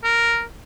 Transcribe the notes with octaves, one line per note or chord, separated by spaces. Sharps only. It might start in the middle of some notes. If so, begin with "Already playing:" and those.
A#4